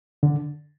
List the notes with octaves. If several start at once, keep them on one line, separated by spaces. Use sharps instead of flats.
D3